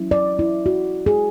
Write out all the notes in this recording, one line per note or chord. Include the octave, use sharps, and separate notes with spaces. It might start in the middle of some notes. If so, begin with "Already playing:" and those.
Already playing: F#3 C#4 E4
D5
E4
F#4
G#4